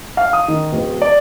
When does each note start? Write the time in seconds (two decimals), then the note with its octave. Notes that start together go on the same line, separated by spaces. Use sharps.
0.17 F5
0.33 D#6
0.48 D#3
0.72 D1
1.02 D5